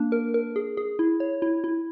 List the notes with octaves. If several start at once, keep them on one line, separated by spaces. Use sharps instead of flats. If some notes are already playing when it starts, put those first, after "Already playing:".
Already playing: A#3 D4
A#4
A#4
G#4
G#4
E4
C#5
E4
E4